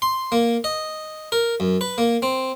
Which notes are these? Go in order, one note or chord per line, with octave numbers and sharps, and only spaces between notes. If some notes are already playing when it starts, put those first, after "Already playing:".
C6
A#3
D#5
A#4
F#2
B4
A#3
C4